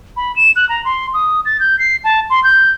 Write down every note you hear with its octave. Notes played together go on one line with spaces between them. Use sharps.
B5
E7
F#6
A#5
C6
D#6
A6
G6
C7
A5
C6
G6